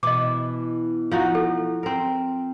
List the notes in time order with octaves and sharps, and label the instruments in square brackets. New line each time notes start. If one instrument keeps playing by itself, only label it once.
[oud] B2 E3 E4 [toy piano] D#5 D6
[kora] F3 D#4 F#4
[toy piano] A4
[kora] C4 A#4